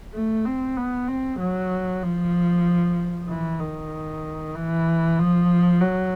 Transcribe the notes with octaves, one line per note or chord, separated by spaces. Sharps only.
A3
C4
B3
C4
F#3
F3
E3
D#3
E3
F3
F#3